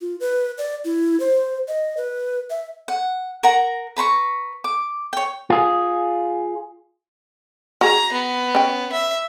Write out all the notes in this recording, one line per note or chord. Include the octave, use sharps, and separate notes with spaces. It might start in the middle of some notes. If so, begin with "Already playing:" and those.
F4
B4
D5
E4
C5
D#5
B4
E5
F#5
A#4 F#5 A#5
B4 A#5 C6 C#6
D6
C#5 G5
F4 G#4
F#4 G#4 A#5
B3
C#4 G5
E5